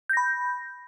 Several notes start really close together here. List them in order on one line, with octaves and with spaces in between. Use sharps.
G6 A#6 B5